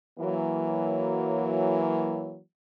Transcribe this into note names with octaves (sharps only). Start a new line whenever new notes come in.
E3 F#3 A#3